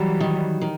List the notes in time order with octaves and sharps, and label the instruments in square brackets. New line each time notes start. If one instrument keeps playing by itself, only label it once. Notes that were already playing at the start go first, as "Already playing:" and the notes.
Already playing: [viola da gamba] E3 G3 [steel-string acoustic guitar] F#3
[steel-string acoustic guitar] D#3
D#3